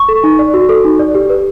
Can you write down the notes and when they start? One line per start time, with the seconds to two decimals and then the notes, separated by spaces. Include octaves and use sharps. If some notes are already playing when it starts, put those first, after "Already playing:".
Already playing: C#6
0.09 A4
0.24 D#4
0.39 D5
0.54 F#4
0.69 A4
0.84 D#4
0.99 D5
1.14 G4
1.30 B4